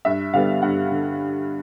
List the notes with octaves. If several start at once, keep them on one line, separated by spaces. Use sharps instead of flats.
G2 E5
D3 G3 B3 F5
G2 F#5
D3